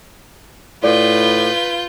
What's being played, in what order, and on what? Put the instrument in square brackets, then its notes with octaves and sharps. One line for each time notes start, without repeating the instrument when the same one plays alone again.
[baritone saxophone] A2 [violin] F4 G6 [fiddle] B4 [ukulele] D5